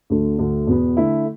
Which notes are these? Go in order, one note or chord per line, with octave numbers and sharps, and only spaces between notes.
D2 D3 A3
D2 D3 A3
E2 B2 B3
D3 A3 E4